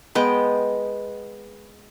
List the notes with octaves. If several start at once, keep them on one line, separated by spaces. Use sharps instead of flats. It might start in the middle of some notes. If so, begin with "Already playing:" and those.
G#3 B3 B4 G5